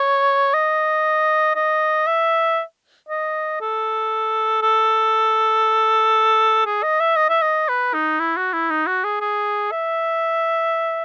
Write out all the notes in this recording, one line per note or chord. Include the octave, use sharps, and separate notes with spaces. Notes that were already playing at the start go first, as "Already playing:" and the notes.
Already playing: C#5
D#5
D#5
E5
D#5
A4
A4
G#4
D#5
E5
D#5
E5
D#5
B4
D#4
E4
F#4
E4
D#4
F#4
G#4
G#4
E5